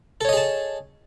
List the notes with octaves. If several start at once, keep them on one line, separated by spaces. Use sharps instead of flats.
G#4 A4 C#5 D#5 A5